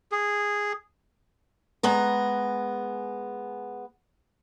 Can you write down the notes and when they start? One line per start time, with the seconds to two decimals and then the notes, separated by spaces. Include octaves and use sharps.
0.12 G#4
1.83 G#3 B3 A#5